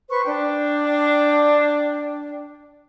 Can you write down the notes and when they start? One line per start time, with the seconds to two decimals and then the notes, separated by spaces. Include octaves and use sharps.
0.09 B4 C5 C#6
0.25 D4 G5